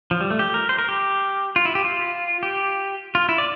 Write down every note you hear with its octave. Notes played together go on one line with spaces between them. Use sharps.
F3
G3
A3
G4
A#4
C5
A#4
G4
F4
E4
G4
F4
G4
F4
E4
D5